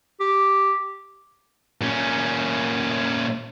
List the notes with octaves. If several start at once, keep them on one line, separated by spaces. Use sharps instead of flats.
G4
A#2 C#4